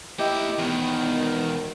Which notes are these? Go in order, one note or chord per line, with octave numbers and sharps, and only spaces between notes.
A#3 E4 G4 D#5
E2 B2 D#3